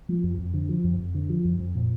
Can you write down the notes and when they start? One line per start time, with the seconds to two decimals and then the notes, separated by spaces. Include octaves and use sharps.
0.09 F3
0.23 F2
0.38 F2
0.54 D3
0.69 F3
0.84 F2
0.99 F2
1.14 D3
1.30 F3
1.44 F2
1.60 F2
1.75 A#2